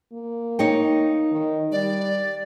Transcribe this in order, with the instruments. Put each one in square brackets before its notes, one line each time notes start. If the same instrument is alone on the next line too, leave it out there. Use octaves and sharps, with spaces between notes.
[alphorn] A#3
[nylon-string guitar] D#4 C#5 G5
[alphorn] D#3
[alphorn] G3 [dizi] D5